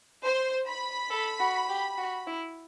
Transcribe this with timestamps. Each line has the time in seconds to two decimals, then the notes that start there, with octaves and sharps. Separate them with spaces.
0.24 C5
0.67 B5
1.11 A4
1.40 F#4
1.69 G4
1.98 F#4
2.27 E4